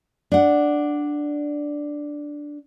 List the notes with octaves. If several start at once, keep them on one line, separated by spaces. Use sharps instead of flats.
D4 F#5